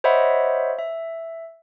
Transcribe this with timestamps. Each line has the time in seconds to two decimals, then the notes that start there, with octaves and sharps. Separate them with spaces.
0.04 C5 C#5 D#5 E5 F#5 B5
0.79 E5